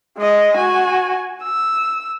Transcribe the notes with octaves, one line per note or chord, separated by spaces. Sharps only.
G#3 D#5
F#4 G#5
E6